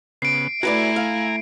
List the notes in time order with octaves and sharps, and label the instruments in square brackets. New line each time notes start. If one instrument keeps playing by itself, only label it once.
[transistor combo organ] C#3 B3 [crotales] C7 D7
[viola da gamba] A3 E4 [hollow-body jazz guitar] F#4 B4 D5 [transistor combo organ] G#5 A#5
[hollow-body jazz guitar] F5